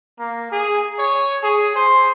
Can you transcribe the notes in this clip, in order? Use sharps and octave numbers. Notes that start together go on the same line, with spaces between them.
A#3
G#4
C#5
G#4
C5